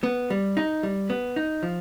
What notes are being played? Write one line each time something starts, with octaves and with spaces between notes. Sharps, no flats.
B3
G3
D#4
G3
B3
D#4
F3